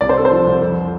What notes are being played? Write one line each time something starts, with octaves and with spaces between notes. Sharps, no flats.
C2 D5
C5
C3 A4
C5
F3
C2
F2